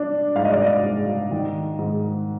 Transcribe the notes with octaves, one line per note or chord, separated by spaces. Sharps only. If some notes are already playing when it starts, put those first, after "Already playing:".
Already playing: D4
G#2 F5
D#5
D5
D#5
G#2
D#3
G#2